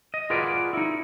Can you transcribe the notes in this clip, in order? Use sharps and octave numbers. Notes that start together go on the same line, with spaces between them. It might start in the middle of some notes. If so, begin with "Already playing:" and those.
D#5
F4 F#4 G#4 A#4 B4 D5
D#4 E4